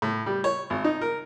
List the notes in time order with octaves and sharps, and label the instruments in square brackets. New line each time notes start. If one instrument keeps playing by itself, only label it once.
[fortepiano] A2
G3
C#5
G#1
D#4
A#4